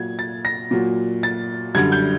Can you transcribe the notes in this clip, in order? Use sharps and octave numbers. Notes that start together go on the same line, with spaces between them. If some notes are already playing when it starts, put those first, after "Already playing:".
Already playing: A#2 F#3 G#6
A6
A#6
A#2 F#3
A6
F#2 D3 G3 G#6
G6